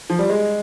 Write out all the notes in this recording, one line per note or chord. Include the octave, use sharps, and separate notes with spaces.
F3
G3
G#3